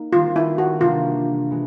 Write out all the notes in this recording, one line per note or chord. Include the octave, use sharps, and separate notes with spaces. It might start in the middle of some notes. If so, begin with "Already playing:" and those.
Already playing: A#3 D#4
D#3 G3 C4 F4
E4
F#4
C3 E3 G3 A#3 D4 F4
E3 G#3